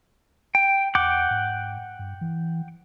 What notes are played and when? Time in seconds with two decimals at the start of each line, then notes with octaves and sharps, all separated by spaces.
0.55 G5
0.95 E2 F#5 G5 D6
1.31 G#2
1.99 G2
2.21 E3